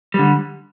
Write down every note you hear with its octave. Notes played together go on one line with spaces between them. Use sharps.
D3 G3